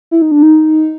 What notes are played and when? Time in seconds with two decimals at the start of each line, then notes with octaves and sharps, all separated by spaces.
0.11 E4
0.22 D#4
0.31 D4
0.43 D#4